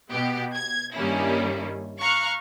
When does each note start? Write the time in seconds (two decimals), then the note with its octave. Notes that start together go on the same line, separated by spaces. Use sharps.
0.10 B2 B3 G4
0.56 G#6
0.96 G2 D#3 G3 A#3 C#4 E4
2.01 F5 A#5 C#6 F6 F#6